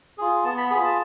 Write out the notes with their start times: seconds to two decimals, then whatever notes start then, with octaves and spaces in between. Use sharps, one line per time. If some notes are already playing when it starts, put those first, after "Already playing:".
0.18 F4 G#4
0.44 B3 A5
0.58 B5
0.71 F4 G#4 B5
0.84 A5